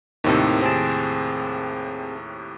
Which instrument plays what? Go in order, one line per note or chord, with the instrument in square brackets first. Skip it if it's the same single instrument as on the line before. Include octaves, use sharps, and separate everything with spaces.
[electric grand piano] D#2 A2 C3 [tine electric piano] D#3 C4 A4
[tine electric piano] C4 G#4 A5